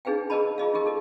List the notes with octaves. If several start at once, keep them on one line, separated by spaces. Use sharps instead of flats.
D4 D#4 G#4 B4 F5 G5
G#4 A#4 B4 D#5 A5 B5
F4 G#4 D#5 F5
D#4 G4 G#4 A#4
D#4 A4 D#5